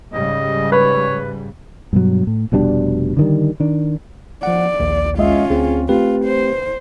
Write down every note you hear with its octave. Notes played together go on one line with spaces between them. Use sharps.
G#2 C#3 G3 D#5
B4 C#5
G2 B2 F#3
A2
F1 B2 G3 D4
D3 D#3 G3
D#3 D4
F3 D5 F#5
A#1 D#2
G#3 C#4 F4 D#5 E5
D2 C4 G#4
A3 C4 F4 G4 B4
C5